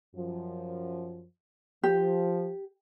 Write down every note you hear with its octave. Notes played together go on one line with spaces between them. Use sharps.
F#2 F3
F3 G4